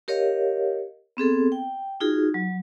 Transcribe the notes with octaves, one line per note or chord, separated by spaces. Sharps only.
G4 A#4 C#5 D#5 F5
B3 C4 G#4 A4
G5
D#4 F4 F#4 G#4
F#3